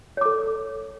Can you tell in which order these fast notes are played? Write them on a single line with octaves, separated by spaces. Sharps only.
C#5 D6 A4